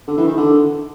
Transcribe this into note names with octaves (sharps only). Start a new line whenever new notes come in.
D3
E3
D#3
D3